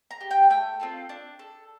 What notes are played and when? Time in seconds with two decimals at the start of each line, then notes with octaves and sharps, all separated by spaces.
0.11 A#5
0.21 G4
0.31 G5
0.50 A3 G5
0.80 C4 F4 A4
1.09 D4
1.39 A4